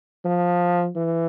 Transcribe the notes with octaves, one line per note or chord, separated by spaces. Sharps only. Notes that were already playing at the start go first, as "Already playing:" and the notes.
F3
E3